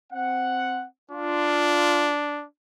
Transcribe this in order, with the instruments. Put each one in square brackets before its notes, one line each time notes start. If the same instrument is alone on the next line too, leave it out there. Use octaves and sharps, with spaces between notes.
[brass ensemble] C4 F#5
[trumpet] D4 [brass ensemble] F4